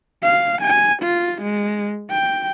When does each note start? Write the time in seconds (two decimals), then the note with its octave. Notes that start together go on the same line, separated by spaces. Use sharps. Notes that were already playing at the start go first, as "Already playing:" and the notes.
0.23 F5
0.62 G#5
1.03 F4
1.42 G#3
2.11 G5